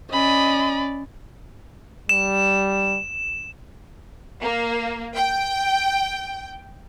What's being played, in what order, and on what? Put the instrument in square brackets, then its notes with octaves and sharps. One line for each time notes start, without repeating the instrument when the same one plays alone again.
[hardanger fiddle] C#4 D5 [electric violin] D#5 B5
[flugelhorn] G3 [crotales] E7
[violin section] A#3
G5